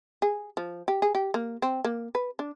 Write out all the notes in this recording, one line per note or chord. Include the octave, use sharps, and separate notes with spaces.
G#4
F3
G4
G#4
G4
A#3
C4
A#3
B4
D4